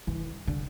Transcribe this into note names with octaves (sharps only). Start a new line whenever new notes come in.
E3
D3